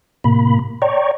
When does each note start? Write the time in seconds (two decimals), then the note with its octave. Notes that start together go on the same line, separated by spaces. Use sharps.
0.24 A2 C3 A#3 B5
0.82 C#5 D5 G5 A#5 C#6